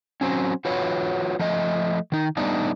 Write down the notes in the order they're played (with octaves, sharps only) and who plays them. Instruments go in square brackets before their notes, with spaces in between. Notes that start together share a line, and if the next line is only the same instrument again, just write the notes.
[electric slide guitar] F#3 C4 C#4
F4 F#4 B4 C#5
F3 A3 D#5
D#3 D#4
G3 A3 B3 D4 D#4